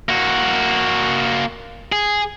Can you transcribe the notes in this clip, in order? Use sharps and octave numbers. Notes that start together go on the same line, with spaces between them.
A#3 F#4
G#4